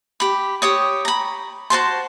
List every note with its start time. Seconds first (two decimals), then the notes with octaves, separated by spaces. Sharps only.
0.20 G4 B5
0.62 G4 C#5 D#6
1.05 A#5 B5
1.70 F#4 C5 A5 C6